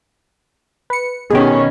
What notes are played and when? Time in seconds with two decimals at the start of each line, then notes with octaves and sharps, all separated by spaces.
0.90 B4 C#7
1.30 B2 D#3 C#4 G4 G#4